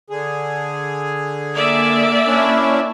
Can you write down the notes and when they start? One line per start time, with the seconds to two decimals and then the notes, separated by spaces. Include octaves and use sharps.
0.10 D3 G#4
1.54 A#3 D5 E5
2.27 C#4 D4 E4